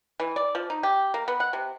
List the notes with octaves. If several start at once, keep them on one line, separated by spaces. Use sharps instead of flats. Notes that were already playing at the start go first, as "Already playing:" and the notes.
E3
D5
F3
D#4
G4
A#3
B3
F#5
C3